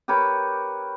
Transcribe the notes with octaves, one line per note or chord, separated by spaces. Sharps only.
G4 A#4 B4 C#5